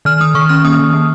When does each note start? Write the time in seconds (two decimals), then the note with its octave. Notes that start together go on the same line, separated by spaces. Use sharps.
0.05 D#3 F6
0.21 D#3 D#6
0.34 D#3 C#6
0.49 C#4 F6
0.64 A#3 D#6
0.80 D#3
0.94 A#3